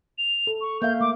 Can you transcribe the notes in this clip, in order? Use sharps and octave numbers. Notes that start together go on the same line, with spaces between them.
F7
A4
C#6
A#3 E5 F5 G6
A3 D6